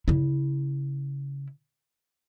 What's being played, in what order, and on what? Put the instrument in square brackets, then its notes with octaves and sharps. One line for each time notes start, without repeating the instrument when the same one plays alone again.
[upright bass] C#3 E4